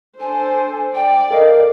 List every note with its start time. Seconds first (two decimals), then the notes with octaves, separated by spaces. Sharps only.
0.20 D4 A4 C5 G#5
0.95 D5 G5
1.31 A4 A#4 D#5 F5